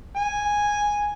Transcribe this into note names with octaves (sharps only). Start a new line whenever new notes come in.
G#5